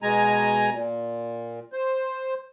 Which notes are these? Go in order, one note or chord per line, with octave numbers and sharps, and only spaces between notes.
B2 G#3 G#5 A#5
A#2
C5